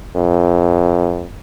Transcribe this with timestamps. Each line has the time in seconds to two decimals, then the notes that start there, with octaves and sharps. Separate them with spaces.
0.16 F2